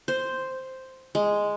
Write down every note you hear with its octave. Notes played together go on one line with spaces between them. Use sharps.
C5
G#3